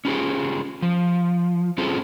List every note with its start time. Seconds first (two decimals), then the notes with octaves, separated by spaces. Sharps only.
0.05 C#4 F4 G4 G#4
0.82 F3
1.78 C4 C#4 F4 G#4 A4